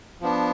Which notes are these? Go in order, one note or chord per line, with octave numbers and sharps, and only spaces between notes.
F3 B3 D4